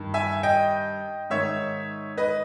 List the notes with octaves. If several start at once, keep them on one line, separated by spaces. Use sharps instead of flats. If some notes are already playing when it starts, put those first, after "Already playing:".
Already playing: G2 D#3
E5 G#5
D#5 G5
G#2 D#3 C#5 E5
B4 D#5